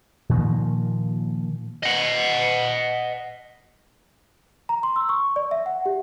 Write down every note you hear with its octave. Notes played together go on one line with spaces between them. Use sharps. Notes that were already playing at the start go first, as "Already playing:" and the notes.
A#2 D#3 F3 A#3
D#5 F#5
A#5
C6
E6
C#6
D5
E5
F#5
G4